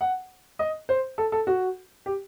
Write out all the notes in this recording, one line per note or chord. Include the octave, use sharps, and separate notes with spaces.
F#5
D#5
C5
A4
A4
F#4
G4